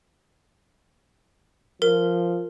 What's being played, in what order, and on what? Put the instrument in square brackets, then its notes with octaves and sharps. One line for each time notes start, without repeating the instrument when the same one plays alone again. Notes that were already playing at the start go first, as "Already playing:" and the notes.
[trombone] F3 [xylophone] A#4